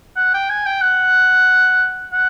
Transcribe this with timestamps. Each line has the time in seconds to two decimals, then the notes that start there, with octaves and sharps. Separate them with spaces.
0.17 F#5
0.34 G5
0.50 G#5
0.66 G5
0.82 F#5
2.13 F#5